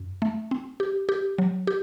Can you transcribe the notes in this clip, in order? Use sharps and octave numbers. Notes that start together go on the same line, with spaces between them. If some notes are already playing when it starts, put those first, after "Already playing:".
Already playing: F#2
A3
C4
G4
G4
F#3
G4